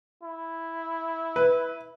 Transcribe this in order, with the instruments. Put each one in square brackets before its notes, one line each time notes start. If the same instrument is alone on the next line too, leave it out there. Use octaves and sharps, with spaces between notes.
[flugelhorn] E4
[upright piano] B4